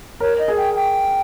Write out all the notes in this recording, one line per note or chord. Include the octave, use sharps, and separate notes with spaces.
A#4 C#5
D#5
G#4
G5
G5